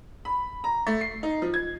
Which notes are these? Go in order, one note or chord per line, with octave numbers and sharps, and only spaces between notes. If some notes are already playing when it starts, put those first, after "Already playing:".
B5
A#5
A3
C7
D#4
F3
G#6